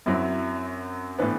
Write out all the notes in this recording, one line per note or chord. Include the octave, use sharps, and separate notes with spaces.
F#2 F#3 C4 E4
A2 E3 B3 D4